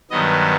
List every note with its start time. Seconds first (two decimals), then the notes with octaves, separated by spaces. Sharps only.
0.11 G2 D#3 F#3 B3 D#5